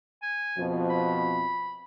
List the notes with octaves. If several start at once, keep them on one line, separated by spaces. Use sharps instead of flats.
G#5
F2 B2 F3
B5